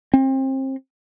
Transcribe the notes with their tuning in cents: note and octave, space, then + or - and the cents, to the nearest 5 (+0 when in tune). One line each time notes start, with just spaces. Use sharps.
C4 +30